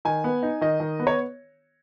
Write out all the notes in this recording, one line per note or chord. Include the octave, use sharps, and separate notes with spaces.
D#3 G#5
B3
D#4
D#3 D#5
D#3
B3
C#5